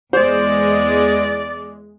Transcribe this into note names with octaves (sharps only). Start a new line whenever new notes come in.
E2 G#3 C5 D5